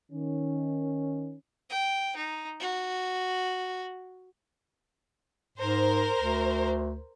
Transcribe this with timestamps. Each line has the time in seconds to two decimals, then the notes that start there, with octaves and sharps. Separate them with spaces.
0.12 D#3 C#4
1.69 G5
2.16 D#4
2.60 F#4
5.58 G#2 A#4 C5
6.18 D2